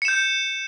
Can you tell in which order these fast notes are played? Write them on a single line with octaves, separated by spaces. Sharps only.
C#7 E7 G6